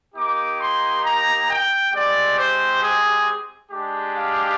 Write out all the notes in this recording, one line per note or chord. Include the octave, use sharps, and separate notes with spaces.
A#3 D#4 G4 D6
C6
A#5
G5
G#3 C4 G4 D5
C5
G#4
G#3 D4 G4
F5